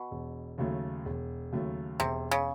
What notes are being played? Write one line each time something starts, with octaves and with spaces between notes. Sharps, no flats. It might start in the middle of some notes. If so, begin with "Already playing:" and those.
Already playing: B2
E1
D#2 C#3 F#3 A3
E1
D#2 C#3 F#3 A3
E1 C3
C#3